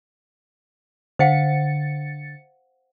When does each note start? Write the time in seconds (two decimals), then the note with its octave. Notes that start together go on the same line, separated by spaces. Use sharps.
1.19 D3 C5 F5 F#5 A6 C#7